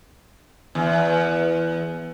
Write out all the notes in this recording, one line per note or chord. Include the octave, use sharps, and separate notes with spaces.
E2